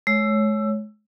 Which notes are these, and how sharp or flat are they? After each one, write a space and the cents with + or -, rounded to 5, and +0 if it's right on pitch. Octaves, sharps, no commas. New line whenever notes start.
G#3 +40 C#5 +0 E6 +15